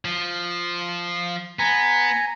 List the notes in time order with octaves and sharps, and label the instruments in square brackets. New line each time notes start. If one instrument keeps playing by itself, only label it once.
[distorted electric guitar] F3
[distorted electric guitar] B3 [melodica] G#5 A#5